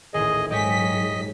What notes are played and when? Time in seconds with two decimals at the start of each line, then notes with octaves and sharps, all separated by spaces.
0.14 D#1 A1 G#4 D#5
0.51 G#2 F#3 G4 G#4 C#5 D#5 B6